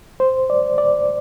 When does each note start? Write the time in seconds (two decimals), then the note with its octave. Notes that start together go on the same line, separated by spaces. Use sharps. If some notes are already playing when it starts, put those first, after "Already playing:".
0.20 C5
0.50 D5
0.78 D5